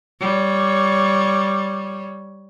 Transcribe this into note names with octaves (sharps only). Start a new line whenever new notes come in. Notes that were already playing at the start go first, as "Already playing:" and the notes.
G3 C#5